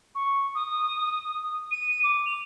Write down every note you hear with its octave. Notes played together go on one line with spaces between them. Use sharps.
C#6
D#6
D#7
D6
F7